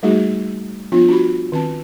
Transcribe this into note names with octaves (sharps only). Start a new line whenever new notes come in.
G3 A3 A#3 D#4 F#4 G#4
F3 B3 D4 F4
D4 F#4 B5
D#3 C4 A5